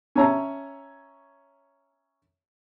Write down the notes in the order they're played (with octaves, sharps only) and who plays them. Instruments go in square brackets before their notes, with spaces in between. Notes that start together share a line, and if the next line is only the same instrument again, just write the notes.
[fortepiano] C#4 C#5 E5 A5 A#5